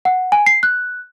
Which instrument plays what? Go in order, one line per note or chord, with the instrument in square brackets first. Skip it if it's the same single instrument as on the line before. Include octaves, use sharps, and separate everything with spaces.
[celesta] F#5
G#5
C7
F#6